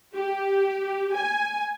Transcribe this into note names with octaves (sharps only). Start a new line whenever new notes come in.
G4
G#5